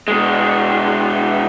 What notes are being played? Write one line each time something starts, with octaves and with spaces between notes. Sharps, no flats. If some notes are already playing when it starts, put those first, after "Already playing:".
B2 G#3